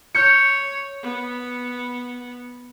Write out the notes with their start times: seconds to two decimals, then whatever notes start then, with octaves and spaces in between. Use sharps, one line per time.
0.14 C#5 F6 G6 C#7
1.02 B3